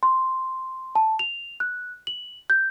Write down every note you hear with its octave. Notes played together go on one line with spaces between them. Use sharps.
C6
A5
F7
F#6
F#7
G6